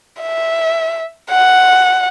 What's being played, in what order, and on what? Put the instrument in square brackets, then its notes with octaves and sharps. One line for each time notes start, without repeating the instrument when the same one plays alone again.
[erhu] E5
F#5